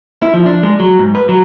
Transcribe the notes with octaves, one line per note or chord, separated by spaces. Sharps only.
E4
F3
D4
G#3
F#3
G#2
B4
F#3